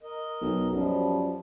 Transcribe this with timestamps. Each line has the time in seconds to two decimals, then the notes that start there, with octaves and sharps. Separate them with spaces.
0.03 A#4 D#5
0.41 B1
0.72 F#2 F3 G3